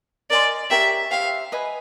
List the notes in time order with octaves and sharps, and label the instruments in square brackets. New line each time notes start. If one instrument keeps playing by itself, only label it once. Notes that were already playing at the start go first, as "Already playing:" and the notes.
[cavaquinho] A#4 D#5 G#5 C6 [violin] D5
[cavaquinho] G4 A#4 C#5 [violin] E5
[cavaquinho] G4 C5 E5 [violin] F5
[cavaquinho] B4 D#5 G#5